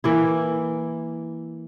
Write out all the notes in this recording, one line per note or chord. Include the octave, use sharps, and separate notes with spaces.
E3 A#3 E4